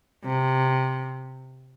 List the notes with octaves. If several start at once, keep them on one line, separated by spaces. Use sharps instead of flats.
C3